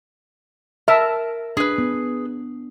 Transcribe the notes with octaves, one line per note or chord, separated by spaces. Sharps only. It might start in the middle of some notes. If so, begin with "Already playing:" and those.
A#4 E5 A5
D4 G#4 B4
B3